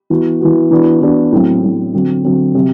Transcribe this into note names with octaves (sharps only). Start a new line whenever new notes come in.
E3 B3 F#4
E3 B3 F#4
E3 B3 D4 F#4
E3 B3 D4 F#4
A2 F#3 C4
A2 F#3 C4
D3 F#3 C4 F#4
D3 F#3 C4 F#4
C3 F#3 C4 G4